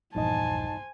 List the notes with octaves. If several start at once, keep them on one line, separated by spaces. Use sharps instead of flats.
A#1 E2 G2 D#4 C5 D#5 G#5 A5